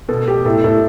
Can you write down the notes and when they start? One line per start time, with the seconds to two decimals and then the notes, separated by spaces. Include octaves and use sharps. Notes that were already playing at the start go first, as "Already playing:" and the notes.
0.09 B2 A4
0.27 B2 G4
0.45 A2 A4
0.64 A2 A4